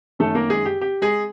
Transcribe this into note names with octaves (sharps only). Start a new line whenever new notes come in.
F#2 D#3 F#3 A3 A4
A#3 A#4
G#3 G#4
G4
G4
G#3 G#4